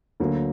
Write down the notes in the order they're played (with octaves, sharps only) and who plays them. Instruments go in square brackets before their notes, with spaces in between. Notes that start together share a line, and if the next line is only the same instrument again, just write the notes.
[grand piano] D2 D3 F#3 A#3